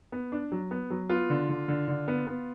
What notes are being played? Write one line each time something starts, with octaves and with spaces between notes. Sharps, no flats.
B3
D4
F#3
B3
F#3
B3 F4
D3
D3
D3
D3
B3
B3